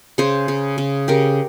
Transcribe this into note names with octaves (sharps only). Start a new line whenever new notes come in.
C#3 G#4 C5
C#3
C#3
C#3 G4 A#4